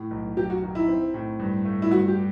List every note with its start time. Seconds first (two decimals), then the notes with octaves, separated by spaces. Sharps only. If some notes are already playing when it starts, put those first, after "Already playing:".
Already playing: A2
0.11 B1
0.37 F#2 G4
0.50 F#4
0.62 D#3
0.75 E4
0.88 C4
1.14 A2
1.40 G2
1.65 A3
1.82 E4
1.91 G2 F#4
2.08 G4